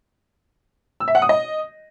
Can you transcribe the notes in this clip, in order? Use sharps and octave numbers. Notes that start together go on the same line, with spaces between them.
E6
E5
F#5
D#6
D#5